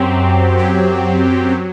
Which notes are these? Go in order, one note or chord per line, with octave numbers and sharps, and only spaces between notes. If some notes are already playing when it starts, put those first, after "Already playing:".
Already playing: F#2 F#3 C4 G4
F#2 F#3 C4 G4
F#3